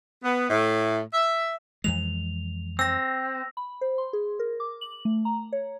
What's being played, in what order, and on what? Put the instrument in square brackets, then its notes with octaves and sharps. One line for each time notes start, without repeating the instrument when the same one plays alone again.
[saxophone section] B3
A2
E5
[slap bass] F2 E3 G#3 [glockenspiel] F7
[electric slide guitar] C4 [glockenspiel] E6 A#6
[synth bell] B5
C5
C6
G#4
A#4
D6
F#7
A3
A#5
C#5